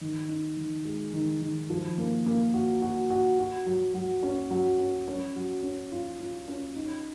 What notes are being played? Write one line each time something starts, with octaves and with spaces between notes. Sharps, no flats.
D#3
D#4
D#3
G#3
D#3
D#3
F3
A#3
A#3
F#4
F#4
F#4
F#4
F#3
F#3
C#4
F#3
C#4
C#4
F#3
C#4
F4
F4
C#4
D#4